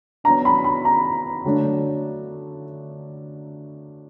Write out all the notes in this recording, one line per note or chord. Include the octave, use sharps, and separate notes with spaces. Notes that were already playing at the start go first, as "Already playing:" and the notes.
F#3 B3 D4 A#5
B5
B5
A#5
D3 F#3 A3 D4